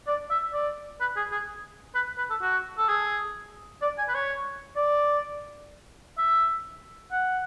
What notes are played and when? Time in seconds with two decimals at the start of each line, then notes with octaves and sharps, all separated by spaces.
0.07 D5
0.30 E5
0.53 D5
1.01 B4
1.17 G#4
1.32 G#4
1.95 B4
2.18 B4
2.30 A4
2.42 F#4
2.78 A4
2.89 G#4
3.82 D5
3.98 G#5
4.08 B4
4.14 C#5
4.76 D5
6.18 E5
7.12 F#5